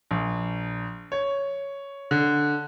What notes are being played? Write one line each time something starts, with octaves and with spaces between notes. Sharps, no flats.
A#1
C#5
D3